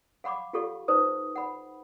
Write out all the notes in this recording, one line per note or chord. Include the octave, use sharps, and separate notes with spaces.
F5 F#5 B5 C#6 D6
F4 G4 A4 F5 C#6
D#4 B4 C5 D#6
F#5 B5